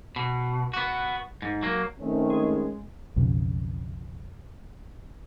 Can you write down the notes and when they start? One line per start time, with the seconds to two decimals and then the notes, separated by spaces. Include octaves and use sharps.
0.16 B2
0.74 B3 F#4
1.42 G#2
1.63 F#3 A#3
2.00 D#3 A3 C4 C#4
2.30 G#3
3.16 B1 F2 C#3